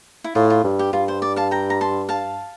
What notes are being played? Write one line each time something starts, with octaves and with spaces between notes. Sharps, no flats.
E4
A2 F4
F4
G2
G4
G2 F4
C5
D5
F5 A5
G5 A#5
A#5
A5 C6
F5 A5